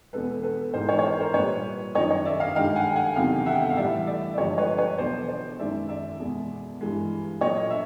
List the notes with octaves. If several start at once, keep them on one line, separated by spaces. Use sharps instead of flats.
E2 B2 G#3 A4 B4
A4 B4
G#2 E3 G#3 A#4 C5
B4 C#5
C#5
A#4 C5
A#4 C5
A#2 G3 B4 C#5
F#2 D#3 F#3 C#5 D#5
C#5 D#5
D5 E5
D#5 F5
G2 D#3 G#3 F5 G5
F#5 G#5
G5
F#5 G#5
E2 C3 D#3 F#3 F5 G5
E5 F#5
G5
F#5
F5
A2 E3 G3 D5 E5
D5 E5
D5
G2 D3 F3 G#3 C#5 D#5
B4 C#5
B4 C#5
E2 B2 F#3 C5 D5
C5 D5
F#2 D#3 G#3 D5 E5
D5 E5
E2 B2 G#3
G2 E3 G#3
A#2 F#3 C#5 D#5
E5